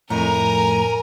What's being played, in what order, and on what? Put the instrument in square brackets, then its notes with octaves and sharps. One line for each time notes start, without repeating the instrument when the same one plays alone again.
[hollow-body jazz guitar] F2 A2 [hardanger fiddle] A#4 G#5 [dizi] A#5